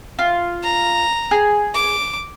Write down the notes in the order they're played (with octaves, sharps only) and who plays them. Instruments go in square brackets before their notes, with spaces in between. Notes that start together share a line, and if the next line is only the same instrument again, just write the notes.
[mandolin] F4
[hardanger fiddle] A#5
[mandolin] G#4
[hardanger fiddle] D6